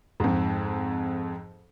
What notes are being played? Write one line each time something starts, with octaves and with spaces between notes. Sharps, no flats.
F2 G#2